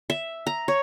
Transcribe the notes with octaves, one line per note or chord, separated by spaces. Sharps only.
E5
A#5
C#5